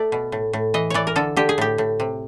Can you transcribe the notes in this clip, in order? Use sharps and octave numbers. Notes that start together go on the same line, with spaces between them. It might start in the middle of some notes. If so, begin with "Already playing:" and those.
Already playing: A3 D5
B2
A2
A2
E3 D#5
E3 C#5 D5
A#4
D3 A4
D3 G4
G#4
A2 G4
A2
C3